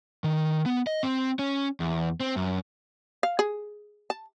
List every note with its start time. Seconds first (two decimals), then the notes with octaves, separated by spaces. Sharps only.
0.24 D#3
0.66 B3
0.87 D#5
1.03 C4
1.39 C#4
1.80 E2
2.20 C4
2.36 F#2
3.23 F5
3.39 G#4
4.10 A5